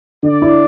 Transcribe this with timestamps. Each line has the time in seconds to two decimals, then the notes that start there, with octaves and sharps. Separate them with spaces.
0.23 D3 D5
0.42 E4